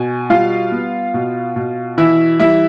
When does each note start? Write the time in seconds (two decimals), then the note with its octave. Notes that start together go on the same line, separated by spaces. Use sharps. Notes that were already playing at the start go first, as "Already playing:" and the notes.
Already playing: B2 G#5
0.30 G3 F4 F5
0.72 B3
1.14 B2
1.56 B2
1.98 E3 E4 E5
2.40 G3 E4 E5